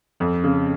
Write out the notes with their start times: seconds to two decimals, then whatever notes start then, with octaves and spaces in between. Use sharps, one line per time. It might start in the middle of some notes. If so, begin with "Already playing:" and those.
0.20 F2
0.44 C#3